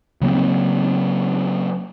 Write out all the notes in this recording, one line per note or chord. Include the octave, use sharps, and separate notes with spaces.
C#3 F#3 A#3 C4